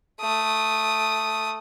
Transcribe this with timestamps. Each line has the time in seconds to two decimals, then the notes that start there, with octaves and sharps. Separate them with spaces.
0.21 A3 D#6